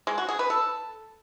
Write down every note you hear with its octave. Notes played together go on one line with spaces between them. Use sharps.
G#3
F#4
G#4
B4
A4